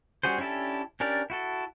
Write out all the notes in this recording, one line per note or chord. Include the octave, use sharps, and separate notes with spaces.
G3 C#4 F#4 G#4 C5
C#4 D4 E4 G4 A4
C#4 D4 G4 A#4 D5
E4 F#4 A4